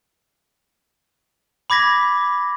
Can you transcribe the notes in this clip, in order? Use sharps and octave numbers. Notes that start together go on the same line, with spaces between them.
B5 D6 G#6 A#6 B6